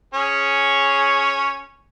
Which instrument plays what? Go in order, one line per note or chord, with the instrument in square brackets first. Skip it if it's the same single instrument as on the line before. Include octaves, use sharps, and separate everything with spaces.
[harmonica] C#4 G#4 C#5